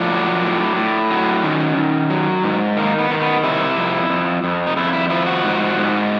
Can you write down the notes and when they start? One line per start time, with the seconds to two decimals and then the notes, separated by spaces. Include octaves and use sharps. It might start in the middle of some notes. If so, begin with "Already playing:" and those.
Already playing: A2 F3 D4
0.10 F#3
0.43 A2
0.76 A2
1.10 F#3
1.43 D#3 C#4
1.77 D#3
2.10 F#3
2.43 G#2
2.77 D#3 A#3
2.98 B3
3.10 D#3
3.21 B3
3.43 C3 E4
3.77 F2
4.10 F2
4.44 F2
4.67 D#4
4.76 F2 E4
4.93 E4
5.10 F3 E4
5.27 F#4
5.44 G#2
5.77 G#2